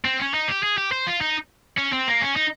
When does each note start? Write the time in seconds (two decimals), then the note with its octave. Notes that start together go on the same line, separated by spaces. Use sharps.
0.05 C4
0.20 C#4
0.34 D#4
0.48 G4
0.63 G#4
0.78 G4
0.92 C5
1.07 F4
1.21 D#4
1.78 C#4
1.93 C4
2.07 A#3
2.21 C#4
2.36 D#4